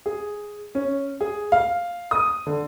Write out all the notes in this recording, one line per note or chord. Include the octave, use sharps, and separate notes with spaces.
G#4
C#4
G#4
F5
D#6
D3